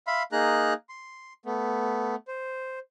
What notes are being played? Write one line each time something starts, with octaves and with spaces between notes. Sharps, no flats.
E5 F5 B5 C6
A#3 D#4 G#4 A#5 F#6
C6
A3 B3
C5